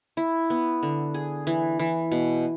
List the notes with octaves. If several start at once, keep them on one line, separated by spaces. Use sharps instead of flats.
E4
B3
D3
G#4
E3
E3
B2